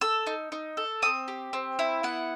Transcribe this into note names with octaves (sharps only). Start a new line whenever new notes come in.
A4 E6
D#4
D#4
A4
C4 D#6
G4
C4
E4
B3 F#5